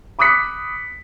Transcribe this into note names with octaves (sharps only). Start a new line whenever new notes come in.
B5 D6 D#6 F#6 B6 C#7